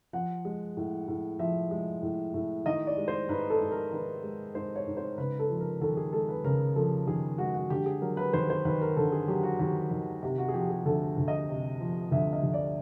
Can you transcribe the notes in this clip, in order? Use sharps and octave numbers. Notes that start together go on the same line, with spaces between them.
F3 F#5
G#3
A2
A2
F3 E5
G#3
A2
A2
D#3 D#5
D5
G#3
C5
G#2 B4
A4
G#2
A#4
D#3 B4
G#3
G#2 C5
C#5
G#2
C5
C#3 B4
A4
F3
A#4
D#2 A4
G#4
G#3 A4
B4
C#3 A#4
F3 A4
D#2 G#4
G#3 F#4
F#4
D3 G4
G#4
F#3 A#4
B4
D#2 C5
C5
D#2 B4
A#4
D3 A4
G#4
F#3 G4
F#4
D#2 G4
D#2
C3 G4
F#4
G#4
F3 G4
G#4
D2 A4
D2
D#5
C3
F3
D2 E5
D#5
D2
D5